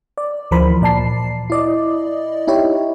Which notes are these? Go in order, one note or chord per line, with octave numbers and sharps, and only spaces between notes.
D5
D2 E3 F3 A#4 C5 B5
A#2 D5 A5 C7
E4 D5 D#5
D#4 E4 G4 C#5